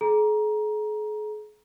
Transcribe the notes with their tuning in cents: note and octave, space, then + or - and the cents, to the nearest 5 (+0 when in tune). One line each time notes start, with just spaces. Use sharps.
G#4 +40 A#5 +20